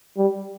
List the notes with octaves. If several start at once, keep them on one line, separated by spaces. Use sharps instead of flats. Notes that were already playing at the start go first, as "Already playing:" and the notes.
G3